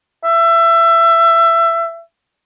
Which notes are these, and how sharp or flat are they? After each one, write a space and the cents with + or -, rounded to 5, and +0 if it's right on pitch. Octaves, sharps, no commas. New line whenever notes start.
E5 +20